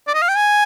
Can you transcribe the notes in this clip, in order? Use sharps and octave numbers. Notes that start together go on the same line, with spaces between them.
D5
D#5
F5
G5
G#5